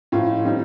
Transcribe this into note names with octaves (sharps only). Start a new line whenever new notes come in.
A2 F3 A3 D#4 F4
D#3 G3 C4 D#4